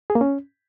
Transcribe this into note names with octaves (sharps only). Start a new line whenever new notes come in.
G#4
A#3
C#4